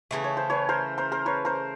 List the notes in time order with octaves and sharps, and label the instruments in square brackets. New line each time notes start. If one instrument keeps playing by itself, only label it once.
[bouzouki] C#3 E3 A3
[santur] C#5
C5
B4 C#5
A#4 C5
A#4 C5
A#4 C5
B4 C#5
A#4 C5